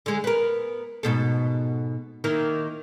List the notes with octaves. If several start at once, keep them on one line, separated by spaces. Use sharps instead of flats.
D3 G#3
B3 A#4
G#2 B2 A4
D#3 A#3 E4